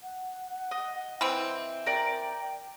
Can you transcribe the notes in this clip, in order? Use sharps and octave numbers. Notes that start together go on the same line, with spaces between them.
F#5
D#5
E3 C4
A#4 D5 G5